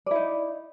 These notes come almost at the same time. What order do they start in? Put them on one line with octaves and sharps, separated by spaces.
D5 E4 D#4